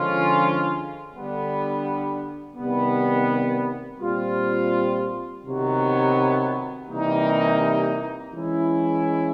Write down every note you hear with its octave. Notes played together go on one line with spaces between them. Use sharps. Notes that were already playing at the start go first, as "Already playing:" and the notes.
Already playing: D3 F3 G#3 C#4 F4
D3 G3 B3
C3 D#3 G3 B3
A#2 G3 C4 F4
C3 D#3 F#3 B3
C3 E3 G3 A#3 D#4
E3 G#3 C#4 E4